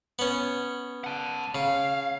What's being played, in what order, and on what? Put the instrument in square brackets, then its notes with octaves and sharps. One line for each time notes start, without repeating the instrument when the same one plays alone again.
[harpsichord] B3 C#4
[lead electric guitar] F#5 A5
[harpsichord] C#3 [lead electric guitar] F5